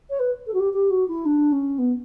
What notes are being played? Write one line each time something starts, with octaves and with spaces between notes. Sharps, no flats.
C#5
B4
A4
F#4
G4
G4
F#4
E4
D4
C#4
B3